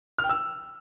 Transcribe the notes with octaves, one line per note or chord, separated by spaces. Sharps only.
F6
G5
E6